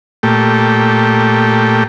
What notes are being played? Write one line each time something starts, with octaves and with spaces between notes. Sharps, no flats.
A#2 A3 G4